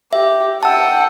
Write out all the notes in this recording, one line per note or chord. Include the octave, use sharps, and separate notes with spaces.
G4 E5
F#5 G5 A5 E6